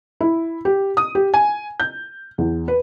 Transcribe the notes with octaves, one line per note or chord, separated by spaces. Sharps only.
E4
G4
D#6
G4
G#5
G6
E2
B4